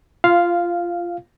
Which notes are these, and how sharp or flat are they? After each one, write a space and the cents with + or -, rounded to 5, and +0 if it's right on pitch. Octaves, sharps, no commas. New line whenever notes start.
F4 -15 F5 +0